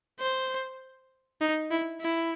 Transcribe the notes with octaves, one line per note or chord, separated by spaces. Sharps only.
C5
D#4
E4
E4